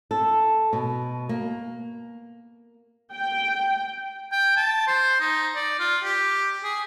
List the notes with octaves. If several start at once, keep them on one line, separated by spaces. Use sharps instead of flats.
A4
B2
A#3
G5
G5
A5
C5
D#4
D5
F4
G4
G#4